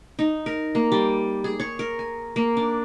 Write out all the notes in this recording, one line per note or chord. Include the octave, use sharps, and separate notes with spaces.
D#4
A#4
A#3
G3
G#4
C#5
A#4
G#5
A#3
D4